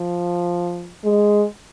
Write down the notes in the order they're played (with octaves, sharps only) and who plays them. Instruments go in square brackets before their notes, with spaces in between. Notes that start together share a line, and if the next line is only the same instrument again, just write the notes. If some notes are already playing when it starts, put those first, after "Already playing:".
Already playing: [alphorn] F3
G#3